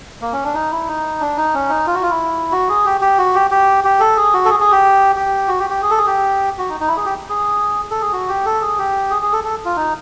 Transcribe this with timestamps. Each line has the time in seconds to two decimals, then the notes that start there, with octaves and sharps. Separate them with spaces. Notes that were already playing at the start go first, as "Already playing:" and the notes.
0.22 A#3
0.32 C#4
0.44 D4
0.54 D#4
0.71 E4
0.88 D#4
1.20 D4
1.37 D#4
1.54 C#4
1.69 D#4
1.86 F4
1.94 F#4
2.03 F4
2.10 E4
2.51 F#4
2.69 G#4
2.86 G4
3.01 G4
3.18 F#4
3.35 G4
3.51 G4
3.84 G4
4.00 A4
4.17 G#4
4.33 F#4
4.45 A4
4.50 G#4
4.60 G#4
4.71 G4
5.16 G4
5.48 F#4
5.59 G4
5.70 G4
5.82 G#4
5.90 A4
5.98 G#4
6.06 G4
6.58 F#4
6.69 D#4
6.80 D#4
6.88 E4
6.97 G#4
7.05 G4
7.29 G#4
7.90 A4
8.01 G#4
8.13 F#4
8.28 G4
8.46 A4
8.61 G#4
8.78 G4
9.10 G#4
9.22 G#4
9.33 A4
9.44 A4
9.65 F4
9.76 D#4